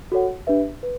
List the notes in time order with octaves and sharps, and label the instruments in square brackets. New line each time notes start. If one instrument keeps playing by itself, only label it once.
[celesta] F#4 A4 C#5 F#5
D4 G4 B4 E5
B4